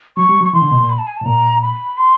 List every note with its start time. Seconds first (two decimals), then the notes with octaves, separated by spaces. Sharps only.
0.17 F#3 C#6
0.29 G3
0.41 F#3
0.44 C#6
0.53 E3 C6
0.62 D3
0.71 B2
0.80 A#2
0.90 B5
0.98 A5
1.07 G#5
1.17 A5
1.21 A2
1.25 A#2 A#5
1.62 B5
1.97 C6